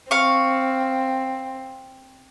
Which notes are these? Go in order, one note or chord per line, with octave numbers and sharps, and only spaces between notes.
C4 F5 C#6